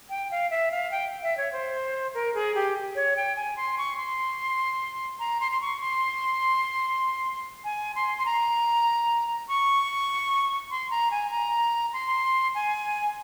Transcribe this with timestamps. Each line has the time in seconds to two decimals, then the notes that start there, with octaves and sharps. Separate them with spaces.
0.10 G5
0.31 F5
0.51 E5
0.72 F5
0.91 G5
1.23 E5
1.37 C#5
1.52 C5
2.14 A#4
2.34 G#4
2.55 G4
2.96 C#5
3.17 G5
3.36 G#5
3.57 C6
3.78 C#6
3.97 C6
5.19 A#5
5.41 C6
5.52 C6
5.61 C#6
5.81 C6
7.64 G#5
7.95 C6
8.18 C6
8.26 A#5
9.49 C#6
10.71 C6
10.91 A#5
11.11 G#5
11.31 A#5
11.93 C6
12.55 G#5